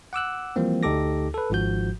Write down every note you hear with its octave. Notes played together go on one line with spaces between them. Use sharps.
F#5 D6 E6 F#6
E3 F3 G3 A#3 C4
D2 D#4 G4 A4 D6 A#6
A4 B4
G#1 G#2 F3 F#4 G6